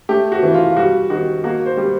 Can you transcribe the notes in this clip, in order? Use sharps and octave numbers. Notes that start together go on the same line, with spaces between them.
A3 G4
F#4
E3
F4
G3 F#4
D#3 F#4
A#3 F#4
C5
G3